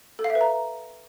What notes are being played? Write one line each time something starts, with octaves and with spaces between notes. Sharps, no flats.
A4
F5
E5
B4
A#5